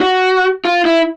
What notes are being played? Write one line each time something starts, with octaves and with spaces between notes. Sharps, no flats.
F#4
F4
E4